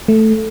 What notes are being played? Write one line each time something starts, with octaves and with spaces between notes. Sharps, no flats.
A3